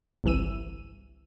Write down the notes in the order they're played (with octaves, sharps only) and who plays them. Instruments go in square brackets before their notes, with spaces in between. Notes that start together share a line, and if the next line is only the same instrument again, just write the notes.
[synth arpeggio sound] G1 C2 E3 E6 D#7